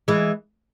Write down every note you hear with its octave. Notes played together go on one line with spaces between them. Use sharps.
E3 G#3